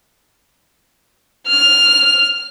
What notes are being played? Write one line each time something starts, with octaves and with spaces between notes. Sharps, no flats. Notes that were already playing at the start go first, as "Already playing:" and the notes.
F6